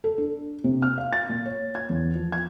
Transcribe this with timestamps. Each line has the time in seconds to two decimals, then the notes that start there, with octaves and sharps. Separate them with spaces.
0.04 A4
0.18 D4
0.64 C3
0.82 F6
0.98 F5
1.13 A6
1.29 A#2
1.46 C#5
1.75 G#6
1.89 E2
2.15 F3
2.32 G#6